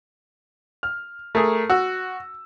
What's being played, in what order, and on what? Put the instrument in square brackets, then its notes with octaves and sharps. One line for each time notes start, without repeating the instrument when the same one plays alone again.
[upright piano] F6
[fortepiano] A3 G#4 [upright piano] A#4
[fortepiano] F#4 [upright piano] E6